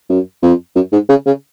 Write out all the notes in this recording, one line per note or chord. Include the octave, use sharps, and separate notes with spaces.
F#2
F2
F#2
G#2
C#3
C#3